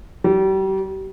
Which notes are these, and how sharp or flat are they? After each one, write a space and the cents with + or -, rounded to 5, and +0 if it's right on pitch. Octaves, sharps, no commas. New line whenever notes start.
G3 -35